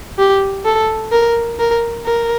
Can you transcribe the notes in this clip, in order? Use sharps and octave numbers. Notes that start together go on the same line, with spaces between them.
G4
A4
A#4
A#4
A#4